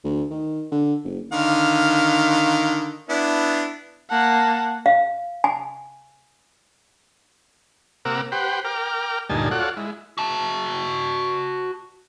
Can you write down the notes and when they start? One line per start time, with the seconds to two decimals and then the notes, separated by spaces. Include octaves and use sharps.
0.04 D2
0.30 D#3
0.72 D3
1.04 F#1
1.32 D3 D#3 F5
3.09 B3 D4 E4
4.10 A#3 F#5 A5
4.86 F5
5.44 G#5
8.05 C3 A#3 A#4 F#5 D6 E6
8.32 G4 B4 C5 F#5 G5
8.65 A#4 G5 D6 F6
9.29 D2 G2 A#2 D#4 G#5 A5
9.51 F4 F#4 A4 C#5 D5 F#5
9.77 G#3 E4
10.18 F#4 A5